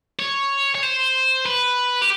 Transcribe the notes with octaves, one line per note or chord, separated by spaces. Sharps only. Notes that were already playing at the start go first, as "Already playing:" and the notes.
C#5
C#5
C5
B4
G4